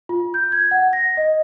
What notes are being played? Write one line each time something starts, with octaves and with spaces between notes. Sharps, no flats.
F4
G6
G#6
F#5
A#6
D#5